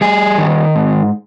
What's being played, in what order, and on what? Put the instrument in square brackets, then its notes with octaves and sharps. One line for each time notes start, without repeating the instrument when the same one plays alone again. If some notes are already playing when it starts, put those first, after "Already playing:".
[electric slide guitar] G3 G#4
D#3
G#2